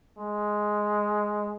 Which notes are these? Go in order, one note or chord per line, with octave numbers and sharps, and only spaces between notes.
G#3